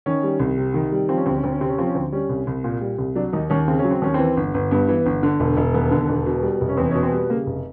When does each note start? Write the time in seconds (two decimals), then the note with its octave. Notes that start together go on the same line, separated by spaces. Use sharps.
0.06 D#3 C#4
0.23 G3
0.40 C2
0.58 C3
0.74 D#3
0.92 G3
1.09 F3 C4
1.17 C#4
1.26 D2 C4
1.35 C#4
1.44 D2 C4
1.52 C#4
1.61 C3 C4
1.69 C#4
1.78 F3 C4
1.86 C#4
1.95 D2 C4
2.12 G3 C#4
2.29 C2
2.47 C2
2.64 A#2
2.81 G3
2.98 C2
3.15 F#3 D4
3.33 D#2 D#4
3.50 D#2 C#4
3.68 C#3 C4
3.79 C#4
3.84 F#3
3.91 C4
4.02 D#2 C#4
4.14 E3 C4
4.37 G1
4.54 G1
4.71 G2 B3
4.88 E3
5.06 G1
5.23 D3
5.40 E1
5.57 E1
5.74 D#2 B3
5.91 D3
6.09 E1
6.26 B2
6.43 G3
6.61 F1
6.69 C#4
6.77 E2 C4
6.91 C#4
6.95 B2
7.03 C4
7.12 G3 B3
7.29 C#3 A#3
7.46 F1